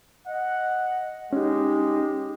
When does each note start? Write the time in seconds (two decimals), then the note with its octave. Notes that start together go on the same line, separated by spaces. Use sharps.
0.27 D#5 F#5
1.33 G#3 C#4 D#4 G4